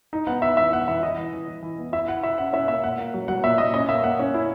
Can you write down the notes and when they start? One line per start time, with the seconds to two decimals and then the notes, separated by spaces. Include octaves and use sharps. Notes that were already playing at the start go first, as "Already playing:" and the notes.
0.13 D#4
0.27 B3 F#5
0.42 B3 E5
0.57 E3 E5
0.72 B3 F#5
0.88 E3 E5
1.02 E4 D#5
1.18 E3
1.33 E3
1.47 E3
1.62 E3
1.78 B3
1.93 E4 E5
2.08 E4 F#5
2.23 E4 E5
2.38 C#4 F#5
2.53 C#4 E5
2.68 A#3 E5
2.84 A#2 F#5
2.99 A#3
3.14 F#3
3.28 F#3 F#5
3.43 A#2 E5
3.58 A#2 D#5
3.74 C#4 D#5
3.89 A#3 E5
4.04 A#3 F#5
4.19 C#4
4.34 E4